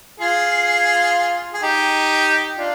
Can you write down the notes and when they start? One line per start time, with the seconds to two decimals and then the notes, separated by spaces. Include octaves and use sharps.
0.20 F4 G#4
1.54 G#4
1.63 D#4 G4
2.58 D4 F4